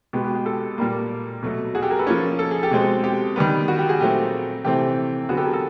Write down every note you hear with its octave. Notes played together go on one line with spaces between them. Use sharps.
B2 G#3 B3 G4
G4
G4
G4 A4
A#2 G3 A#3
B2 F#3 A3
F#4 G#4
G4 A4
G#4 A#4
A4 B4
F3 A#3 C#4
A4
G#4
G4 A4
B2 G#3 C4
G4
D#3 G3 B3
F#4
G4
F#4 G#4
A#2 F#3 A3 C4 G4
C3 E3 A3 C4 G4
D3 F#3 B3 F#4 G#4
G4 A4
G#4 A#4
G4 A4